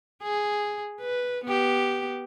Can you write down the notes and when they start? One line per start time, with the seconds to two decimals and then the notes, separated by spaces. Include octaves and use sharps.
0.22 G#4
1.00 B4
1.44 B3 G4